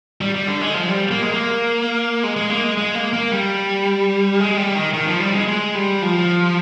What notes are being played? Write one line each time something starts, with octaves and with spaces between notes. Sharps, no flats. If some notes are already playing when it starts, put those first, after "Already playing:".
G3
G3
D3
G#3
F3
G3
A#3
G#3
A#3
G#3
G#3
A#3
G#3
G#3
A#3
A#3
G3
G#3
G3
D#3
D#3
F3
G3
G#3
G#3
G3
F3